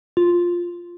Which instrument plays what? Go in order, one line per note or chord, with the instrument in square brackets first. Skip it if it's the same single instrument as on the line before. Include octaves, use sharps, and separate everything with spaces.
[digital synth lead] F4